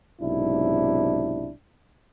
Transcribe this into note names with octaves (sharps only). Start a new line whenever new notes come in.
B1 G#2 C3 D4 E4